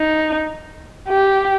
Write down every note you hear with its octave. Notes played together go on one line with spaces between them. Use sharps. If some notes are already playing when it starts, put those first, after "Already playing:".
Already playing: D#4
G4